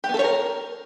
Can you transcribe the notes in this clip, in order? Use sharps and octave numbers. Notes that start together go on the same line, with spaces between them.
G4
B3
A4
C#5
A#4